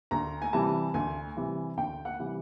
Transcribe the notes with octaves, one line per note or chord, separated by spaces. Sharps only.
D2 A#5
G#5
C3 E3 G3 A5
D2 G#5
C3 E3 G3
D2 G5
F#5
C3 E3 G3